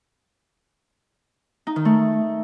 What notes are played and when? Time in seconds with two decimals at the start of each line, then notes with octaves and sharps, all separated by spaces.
1.67 D#4
1.76 D#3
1.85 A3